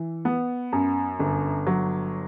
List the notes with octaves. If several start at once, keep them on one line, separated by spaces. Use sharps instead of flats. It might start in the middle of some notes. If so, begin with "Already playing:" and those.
Already playing: E3
B3
F#2
G1
F#3